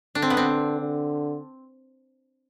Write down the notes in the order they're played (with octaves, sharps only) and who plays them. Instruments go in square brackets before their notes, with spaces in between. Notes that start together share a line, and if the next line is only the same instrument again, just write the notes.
[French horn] D3 [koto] D4
[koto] C4
B3
C4
[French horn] D3